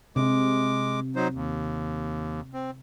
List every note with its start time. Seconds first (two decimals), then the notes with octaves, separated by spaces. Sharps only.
0.16 C3 G#3 D6
1.16 F#3 D#4 C5
1.34 D#2
2.54 C4